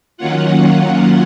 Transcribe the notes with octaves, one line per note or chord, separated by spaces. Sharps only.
D#3 F#3 A#3 C#4 F4 F#5